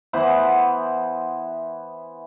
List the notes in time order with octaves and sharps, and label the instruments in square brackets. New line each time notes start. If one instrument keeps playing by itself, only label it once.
[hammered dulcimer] E3 B3 C5 F#5